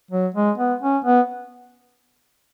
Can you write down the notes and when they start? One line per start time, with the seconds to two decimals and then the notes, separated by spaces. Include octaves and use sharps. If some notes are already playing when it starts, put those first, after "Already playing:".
0.11 F#3
0.35 G#3
0.58 B3
0.82 C#4
1.04 B3